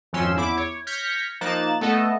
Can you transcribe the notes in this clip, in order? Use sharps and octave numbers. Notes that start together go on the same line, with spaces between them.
G#1 F2 F3 C#4 C6 E6
E2 E4 D6
C#5
F6 G6 G#6 A#6 B6 C#7
F3 A#3 D#4 F#6 A6 E7
A3 B3 A4 D#5